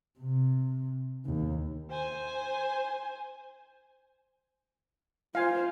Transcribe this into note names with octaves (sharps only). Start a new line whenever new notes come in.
C3
D#2
C5 G#5
F4 C5 F5 G#5